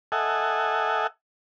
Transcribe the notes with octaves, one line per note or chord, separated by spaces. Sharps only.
A4 D#5 E5 F#5 G#5